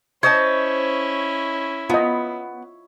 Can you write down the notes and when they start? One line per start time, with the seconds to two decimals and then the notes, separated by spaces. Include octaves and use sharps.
0.23 C#4 E4 C5 C#5 D#5 A5
1.90 B3 F4 D#5